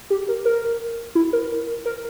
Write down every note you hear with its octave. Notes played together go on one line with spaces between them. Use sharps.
G4
A#4
A#4
E4
A#4
A#4